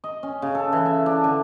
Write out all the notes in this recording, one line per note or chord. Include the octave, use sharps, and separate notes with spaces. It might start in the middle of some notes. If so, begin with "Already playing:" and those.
D#5
C#4
C#3
A4
E3
E5
D4
D3